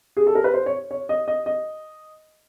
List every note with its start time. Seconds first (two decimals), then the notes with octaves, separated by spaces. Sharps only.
0.17 G#4
0.27 A4
0.35 A#4
0.44 B4
0.54 C5
0.66 C#5
0.91 C#5
1.09 D#5
1.28 D#5
1.46 D#5